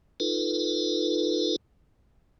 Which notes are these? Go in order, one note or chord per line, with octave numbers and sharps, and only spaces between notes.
D#4 F4 A4 B4